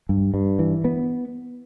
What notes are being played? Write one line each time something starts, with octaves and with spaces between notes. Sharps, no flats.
G2
G2
E3
B3